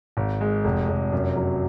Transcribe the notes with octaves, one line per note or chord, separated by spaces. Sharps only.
G#1
G#3
F1
F1
F#2
F#3